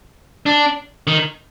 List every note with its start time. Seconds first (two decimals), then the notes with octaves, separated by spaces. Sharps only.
0.46 D4
1.07 D#3